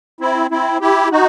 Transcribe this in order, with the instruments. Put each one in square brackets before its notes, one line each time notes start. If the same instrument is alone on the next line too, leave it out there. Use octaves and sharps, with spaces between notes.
[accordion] C4 E4
C4 E4
E4 G4
D#4 F#4